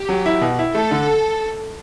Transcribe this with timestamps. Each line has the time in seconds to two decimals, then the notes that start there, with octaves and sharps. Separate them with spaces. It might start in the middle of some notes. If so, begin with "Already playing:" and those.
Already playing: G4
0.09 F#3
0.26 E4
0.41 B2
0.59 E4
0.75 A3 A4
0.91 D3